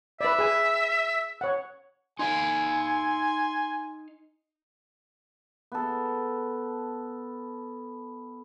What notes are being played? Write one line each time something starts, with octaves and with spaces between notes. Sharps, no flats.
B4 D5 E5
G#4 G#5
C#5 F#5
D#4 D#5 F5 G#5 C6
B3 A4